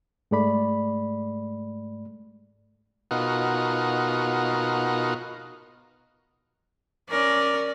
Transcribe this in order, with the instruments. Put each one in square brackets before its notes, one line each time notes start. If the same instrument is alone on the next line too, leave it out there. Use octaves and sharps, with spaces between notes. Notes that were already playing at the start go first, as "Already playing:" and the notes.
[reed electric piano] G#2 G#3 A3 D5 B5
[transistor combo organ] B2 D#4 F4 F#4 A#4
[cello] C#4 A#4 [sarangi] D5